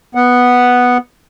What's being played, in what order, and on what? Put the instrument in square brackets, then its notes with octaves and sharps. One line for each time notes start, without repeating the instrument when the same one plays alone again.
[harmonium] B3 F#5